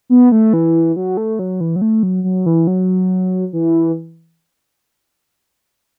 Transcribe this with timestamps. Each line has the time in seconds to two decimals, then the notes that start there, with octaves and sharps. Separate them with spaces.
0.10 B3
0.32 A3
0.53 E3
0.96 F#3
1.17 A3
1.39 F#3
1.61 E3
1.76 F#3
1.82 A3
2.03 F#3
2.24 F#3
2.46 E3
2.67 F#3
3.53 E3